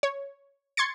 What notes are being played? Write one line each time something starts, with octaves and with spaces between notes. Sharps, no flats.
C#5
C6 C#6 G#6 A6 C#7